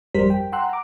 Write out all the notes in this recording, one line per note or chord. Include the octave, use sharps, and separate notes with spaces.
G1 F2 G3 A#4 C5 B6
G5
F#5 G5 A#5 C6 E6 F#6
A#5 D6